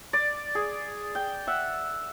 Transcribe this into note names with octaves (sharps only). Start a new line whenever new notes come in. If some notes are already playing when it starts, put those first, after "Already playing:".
D5
G#4
G5
E5 F#5